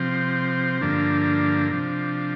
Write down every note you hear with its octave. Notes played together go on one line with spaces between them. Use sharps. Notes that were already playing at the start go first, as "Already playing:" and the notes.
Already playing: C3 F3 C4
G2 D3 F3 A#3 D4
C3 F3 D4